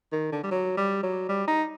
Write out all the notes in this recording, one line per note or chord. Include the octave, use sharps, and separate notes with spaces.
D#3
D3
G3
F#3
G3
F#3
G3
D#4